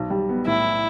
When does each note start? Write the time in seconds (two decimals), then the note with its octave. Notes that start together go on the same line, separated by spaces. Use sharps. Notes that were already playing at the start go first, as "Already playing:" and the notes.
Already playing: B1
0.10 G3
0.29 B3
0.46 A2 E4